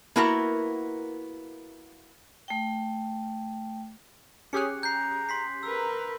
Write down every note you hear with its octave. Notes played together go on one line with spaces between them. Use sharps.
A#3 B3 E4 F#4 A#4 A#5
A3 G5
C#4 G4 G#4 F#6 C#7
A#5 G6 C7
C6 B6 C7
A#4 B4 A#5 E6